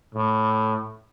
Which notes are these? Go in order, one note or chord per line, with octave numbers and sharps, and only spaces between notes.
A2